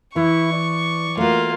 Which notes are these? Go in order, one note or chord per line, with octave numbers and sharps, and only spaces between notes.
E3 E4 C#6
D5
A3 A#3 F4 F#4